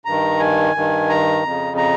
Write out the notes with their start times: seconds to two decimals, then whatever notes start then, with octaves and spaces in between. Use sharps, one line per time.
0.05 G2 D#3 A#5
0.39 G#5
0.75 G2 D#3
1.09 A#5
1.43 F2 C#3
1.77 A#5